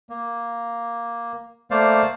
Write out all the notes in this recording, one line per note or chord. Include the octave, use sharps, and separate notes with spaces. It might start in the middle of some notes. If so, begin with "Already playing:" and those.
A#3
A3 A#3 C5 D5 F5